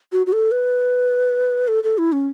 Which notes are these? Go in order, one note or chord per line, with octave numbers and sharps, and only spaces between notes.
F#4
F#4
A4
B4
A4
A4
E4
C#4